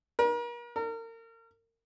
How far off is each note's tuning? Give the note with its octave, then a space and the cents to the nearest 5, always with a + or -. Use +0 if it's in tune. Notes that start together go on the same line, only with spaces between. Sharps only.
A#4 +40
A#4 -35